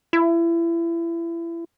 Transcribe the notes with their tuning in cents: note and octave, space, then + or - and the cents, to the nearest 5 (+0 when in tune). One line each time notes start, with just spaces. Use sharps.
E4 +30